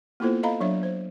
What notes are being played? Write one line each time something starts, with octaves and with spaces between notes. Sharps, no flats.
A#3 B3 E4 F4 A4 C5
A4 D#5 F5 A#5 B5
F#3 D4 C#5 E5
C5